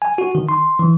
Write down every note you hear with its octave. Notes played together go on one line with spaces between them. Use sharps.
G#5
F#4
D#3
C6
E3